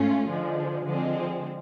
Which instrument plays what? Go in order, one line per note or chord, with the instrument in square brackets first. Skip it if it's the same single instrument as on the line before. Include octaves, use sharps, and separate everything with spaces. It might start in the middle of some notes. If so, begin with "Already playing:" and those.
Already playing: [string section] G#2 A3 C#4 F4
D3 F3 G#3
D3 F3 G#3 C4